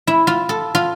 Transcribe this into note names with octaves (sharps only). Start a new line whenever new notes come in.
E4
F4
A4
F4